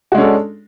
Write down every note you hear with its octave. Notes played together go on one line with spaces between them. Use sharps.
G#3 C#4 D4 F#4 A4